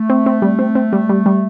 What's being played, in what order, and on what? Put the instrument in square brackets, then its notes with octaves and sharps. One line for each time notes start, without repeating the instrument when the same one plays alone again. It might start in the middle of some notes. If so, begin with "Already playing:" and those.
Already playing: [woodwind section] A3
[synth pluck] C4
C4
G3
C4
C4
G3
G3
G3